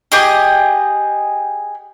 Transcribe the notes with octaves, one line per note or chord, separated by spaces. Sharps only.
G4 G#4 D#5